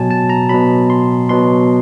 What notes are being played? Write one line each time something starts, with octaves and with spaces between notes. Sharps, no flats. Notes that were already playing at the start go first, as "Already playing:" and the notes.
Already playing: B2 F#3 G#5 A5
A5
A#5
B2 F#3 B5
C6
B2 F#3 C6